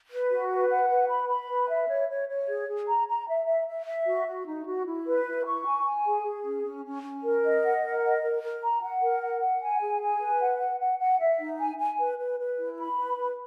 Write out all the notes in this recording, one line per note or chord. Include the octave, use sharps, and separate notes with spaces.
B4
F#4
B4
F#5
B4
B5
B5
B4
E5
C#5
C#5
C#5
G#4
G#4
A#5
A#5
E5
E5
E5
E5
F#4
F#4
D#4
F#4
E4
B4
E4
C#6
G#5
G#5
G#4
G#4
C#4
C#4
C#4
C#4
A#4
D#5
F#5
A#4
D#5
A#4
A#4
A#5
F#5
A#4
F#5
F#5
G#5
G#4
G#5
B4
F#5
F#5
F#5
F#5
E5
D#4
G#5
G#5
B4
B4
B4
E4
B5
B4
B4